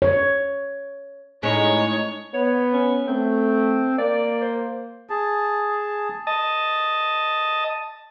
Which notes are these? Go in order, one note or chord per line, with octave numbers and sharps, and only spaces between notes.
C#5
A2 G#3 C#4 D#4 C#5
B3 C#5
C#4
A3 C4
A#3 D5
C5
G#4 A5
D#5 A5